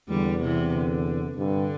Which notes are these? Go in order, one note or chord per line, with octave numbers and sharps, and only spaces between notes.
E2 D3 G3
C3 E3
D3
G2 D3